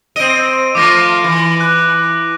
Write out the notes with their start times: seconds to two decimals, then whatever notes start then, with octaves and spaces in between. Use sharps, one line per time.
0.16 C4 D#5 D7 D#7
0.75 F3 A3 F4 D6 A#6
1.24 E3
1.60 F#6